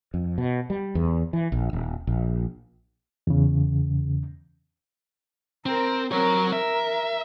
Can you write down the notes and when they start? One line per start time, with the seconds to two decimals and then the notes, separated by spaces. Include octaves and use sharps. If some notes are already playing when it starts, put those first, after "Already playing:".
0.14 F2
0.38 B2
0.70 G3
0.95 E2
1.33 E3
1.52 A#1
1.73 D#1
2.07 A#1
3.27 E2 C#3
5.66 C4 A#4
6.12 F#3 C4 A#4 C#5
6.53 A#4 E5